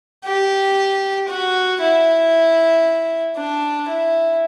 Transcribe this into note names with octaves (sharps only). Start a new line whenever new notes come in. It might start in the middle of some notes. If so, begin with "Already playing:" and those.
G4
F#4
E4
D4
E4